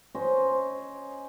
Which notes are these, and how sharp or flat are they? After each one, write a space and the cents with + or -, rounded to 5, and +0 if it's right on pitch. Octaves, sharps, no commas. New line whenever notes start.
C#4 +0 C5 +0 D#5 +0